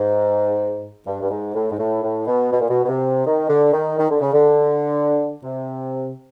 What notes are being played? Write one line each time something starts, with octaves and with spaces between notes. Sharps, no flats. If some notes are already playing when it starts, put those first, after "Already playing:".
Already playing: G#2
G2
G2
G#2
A2
G#2
A2
A2
B2
B2
A#2
B2
B2
C3
D#3
D3
D#3
D#3
D3
C#3
D3
C3